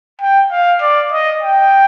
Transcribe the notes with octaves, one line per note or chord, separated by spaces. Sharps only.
G5
F5
D5
D#5
G5